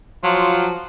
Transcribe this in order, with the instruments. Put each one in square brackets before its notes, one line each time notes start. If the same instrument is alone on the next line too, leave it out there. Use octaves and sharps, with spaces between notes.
[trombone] F3 [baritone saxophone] F#3 [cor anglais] F4